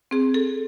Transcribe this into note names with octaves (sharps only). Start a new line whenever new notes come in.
C4 G#4
A4